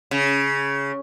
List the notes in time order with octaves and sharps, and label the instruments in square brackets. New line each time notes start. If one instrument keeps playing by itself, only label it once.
[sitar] C#3